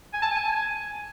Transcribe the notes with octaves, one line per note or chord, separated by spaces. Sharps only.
G#5
A5
G#5